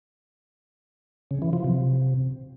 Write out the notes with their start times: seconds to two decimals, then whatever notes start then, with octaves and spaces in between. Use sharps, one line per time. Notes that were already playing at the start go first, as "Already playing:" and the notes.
1.31 C#3
1.42 E3
1.53 F3
1.64 C3